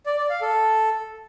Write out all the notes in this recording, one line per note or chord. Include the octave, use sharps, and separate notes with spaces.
D5
D5
F5
A4